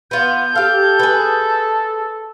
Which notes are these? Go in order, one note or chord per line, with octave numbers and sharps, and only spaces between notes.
B3 F4 G6
G4 A4 F5
G#4 B4